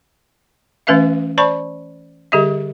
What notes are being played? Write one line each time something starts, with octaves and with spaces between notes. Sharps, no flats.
E3 A3 C#4 B4 E5 F5
C5 D5 A5 B5 C#6
D3 G3 G4 G#4 D#5 E5